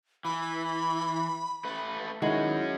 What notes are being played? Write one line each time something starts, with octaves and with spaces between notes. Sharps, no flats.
E3 B5
A3 B4
D#3 G#3 C#4 D#4 E4 F#4 G#4